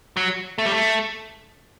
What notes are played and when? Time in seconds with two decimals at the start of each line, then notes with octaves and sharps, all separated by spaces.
0.17 F#3
0.58 A3
0.65 G3
0.72 A3